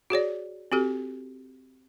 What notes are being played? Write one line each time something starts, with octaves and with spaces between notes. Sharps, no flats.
F#4 G#4 C#5 D5
C4 F#4 G4 A4